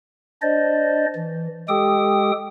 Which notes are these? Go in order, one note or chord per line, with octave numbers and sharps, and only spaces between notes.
D4 C5 D5 D#5
E3
G#3 G4 A4 G5 D#6